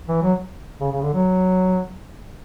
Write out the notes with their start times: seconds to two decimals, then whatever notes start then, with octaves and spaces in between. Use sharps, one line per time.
0.08 E3
0.23 F#3
0.81 C#3
0.92 C#3
1.02 D3
1.14 F#3